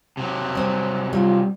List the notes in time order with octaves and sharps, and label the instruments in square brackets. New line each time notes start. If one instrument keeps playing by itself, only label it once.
[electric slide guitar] C3 F#3
[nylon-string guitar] G3 C4
[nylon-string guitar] G3 [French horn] F4